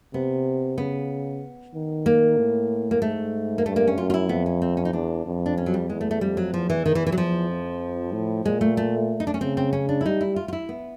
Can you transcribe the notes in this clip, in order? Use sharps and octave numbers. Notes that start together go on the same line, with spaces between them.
C3 B3
C#3 B3
D#3
A#3
A2
A#3
G#2 A3
A#3
G2 A3
A#3
C#4
F#2 F4
F4
E4
F2 B3
C#4
C4
C#4
D#4
E2 D4
F2
D4
C#4
F#3
G3
E2 G#3
A3
A3
F2 G3
F#3
E2 F3
E3
E2 D#3
E3
E3
F#3
F3
F2
A2
A#2 G#3
A3
A3
D#4
D4
C#4
C#3 C4
C4
C#4
D4
E4
G3 D#4
E4
F4
F4
E4
B3